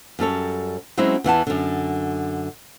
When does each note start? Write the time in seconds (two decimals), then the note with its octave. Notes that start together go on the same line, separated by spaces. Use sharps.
0.19 F#2 G3 A4 C#5
0.97 F#3 G#3 C4 C#4 E4 F#4
1.24 E2 E3 F#5 A5
1.47 F#2 D3